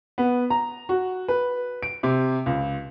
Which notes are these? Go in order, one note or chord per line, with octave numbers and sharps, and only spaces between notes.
B3
A#5
F#4
B4
D7
C3
C#2